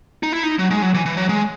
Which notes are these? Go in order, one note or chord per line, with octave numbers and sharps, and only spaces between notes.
D#4
E4
D#4
F#3
G#3
F#3
E3
E3
F#3
G#3